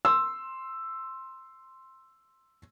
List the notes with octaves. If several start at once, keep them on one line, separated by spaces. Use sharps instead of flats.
C6 E6